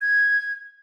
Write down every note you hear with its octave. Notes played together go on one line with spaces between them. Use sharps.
G#6